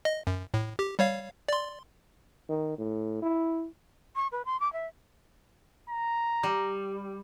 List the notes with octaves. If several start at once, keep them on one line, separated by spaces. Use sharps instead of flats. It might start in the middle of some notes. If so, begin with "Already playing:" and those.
D#5
F#2
A2
G4
G3 C#5 F5
D5 C6
D#3
A2
E4
C#6
B4
C6
D6
E5
A#5
G3